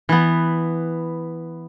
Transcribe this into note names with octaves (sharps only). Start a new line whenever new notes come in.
E3 B3